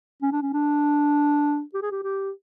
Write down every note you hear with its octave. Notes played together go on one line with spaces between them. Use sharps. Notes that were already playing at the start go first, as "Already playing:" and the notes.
C#4
D4
C#4
D4
G4
G#4
G4
G4